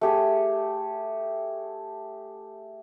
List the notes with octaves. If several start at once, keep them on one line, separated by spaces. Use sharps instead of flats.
A3 G4 G#4